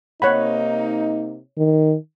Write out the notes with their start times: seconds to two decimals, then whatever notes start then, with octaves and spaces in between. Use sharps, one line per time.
0.22 C3 A#3 D#4 C#5 F#5 B5
1.58 D#3